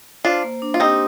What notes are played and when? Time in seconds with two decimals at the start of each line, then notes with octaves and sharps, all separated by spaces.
0.24 D4 F4 C5
0.44 A#3
0.62 D4
0.74 F4
0.80 C4 D#4 G4